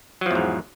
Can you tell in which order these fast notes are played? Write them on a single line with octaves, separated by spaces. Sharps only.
F#3 F3 E2 G#2